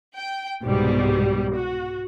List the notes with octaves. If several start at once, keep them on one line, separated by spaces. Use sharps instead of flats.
G5
C2 G#2 B2 G3
F#4